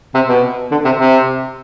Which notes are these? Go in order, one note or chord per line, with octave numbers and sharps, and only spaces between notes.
C3
B2
D3
C3
C3